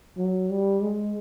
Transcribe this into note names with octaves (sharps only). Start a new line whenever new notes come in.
F#3
G3
G#3